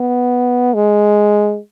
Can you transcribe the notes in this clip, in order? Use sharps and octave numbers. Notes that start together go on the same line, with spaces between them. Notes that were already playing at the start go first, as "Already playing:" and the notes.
Already playing: B3
G#3